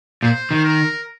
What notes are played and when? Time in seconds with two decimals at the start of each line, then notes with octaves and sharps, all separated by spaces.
0.23 A#2 C5
0.51 D#3
0.64 A#4